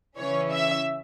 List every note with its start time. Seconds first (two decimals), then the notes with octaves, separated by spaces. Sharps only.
0.18 C#3 E3 C#4 C#5
0.51 E5